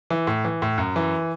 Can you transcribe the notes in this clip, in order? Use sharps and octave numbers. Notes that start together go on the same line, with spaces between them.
E3
A2
E3
A2
F#2
E3